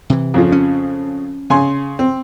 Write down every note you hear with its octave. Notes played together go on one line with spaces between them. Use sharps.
C3 E3
F2 C#3 F3
C#4
C#3 G#5 C6
C4